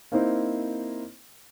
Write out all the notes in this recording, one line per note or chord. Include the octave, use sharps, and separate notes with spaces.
A#3 C4 D#4 E4 C5